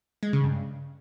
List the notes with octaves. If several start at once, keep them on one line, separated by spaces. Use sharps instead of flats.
G#3
C#3
G2